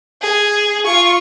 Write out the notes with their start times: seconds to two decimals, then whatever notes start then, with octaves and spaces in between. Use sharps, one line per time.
0.22 G#4
0.86 F4 C#6